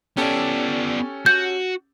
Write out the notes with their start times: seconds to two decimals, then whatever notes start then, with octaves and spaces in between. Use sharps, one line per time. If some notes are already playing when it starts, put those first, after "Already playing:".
0.17 B3 C#4 G4 A4 D5
1.26 F#4 G6